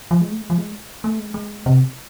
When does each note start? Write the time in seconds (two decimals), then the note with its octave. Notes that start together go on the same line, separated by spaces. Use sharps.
0.11 F3
0.21 G#3
0.31 A3
0.41 G#3
0.50 F3
0.58 G#3
1.04 A3
1.19 G#3
1.34 G#3
1.66 C3